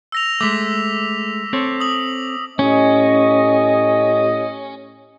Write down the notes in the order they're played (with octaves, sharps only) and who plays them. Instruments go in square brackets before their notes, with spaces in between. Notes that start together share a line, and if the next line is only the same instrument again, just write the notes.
[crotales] E6 A#6 F7
[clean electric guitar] G#3 A3 [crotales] D6 B6
[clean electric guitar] C4 A4 C#5
[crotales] D#6 F#7
[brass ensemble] A2 G4 D#5 [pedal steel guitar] C#4